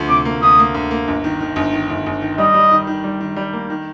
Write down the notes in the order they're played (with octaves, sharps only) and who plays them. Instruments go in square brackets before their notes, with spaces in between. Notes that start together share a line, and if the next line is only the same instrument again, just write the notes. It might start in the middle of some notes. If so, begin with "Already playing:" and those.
Already playing: [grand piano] D2 F3
[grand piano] C3 [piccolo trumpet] D6
[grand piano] A#3
[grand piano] D2 [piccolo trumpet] D#6
[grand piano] A#3
D2
A#3
G1
D#3
D#3
G1
D#3
G1
G1
D#3
[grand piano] G3 [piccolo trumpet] D#5
[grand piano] G3
D#3
D#3
G3
D#3
G3
A#3
D#3